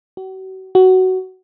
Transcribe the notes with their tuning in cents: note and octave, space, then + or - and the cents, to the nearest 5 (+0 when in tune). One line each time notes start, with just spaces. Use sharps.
F#4 +40
F#4 +15